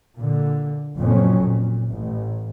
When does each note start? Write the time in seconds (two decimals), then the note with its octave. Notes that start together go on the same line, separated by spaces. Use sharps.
0.17 A#2 D3
0.97 F#1 F2 A#2 F#3 C#4
1.39 A#2
1.89 A1